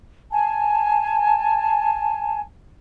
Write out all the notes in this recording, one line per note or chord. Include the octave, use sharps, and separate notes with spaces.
G#5 A5